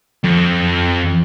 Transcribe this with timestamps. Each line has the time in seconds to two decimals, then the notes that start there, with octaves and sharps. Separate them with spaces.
0.24 F2